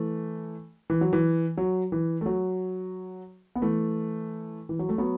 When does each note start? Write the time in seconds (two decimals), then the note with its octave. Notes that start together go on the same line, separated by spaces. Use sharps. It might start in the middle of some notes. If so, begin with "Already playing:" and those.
Already playing: E3 A3
0.90 E3
1.01 F#3
1.13 E3
1.57 F#3
1.92 E3
2.21 A3
2.26 F#3
3.55 B3
3.62 E3 A3
4.69 E3
4.79 F#3
4.89 A3
4.98 F#3 B3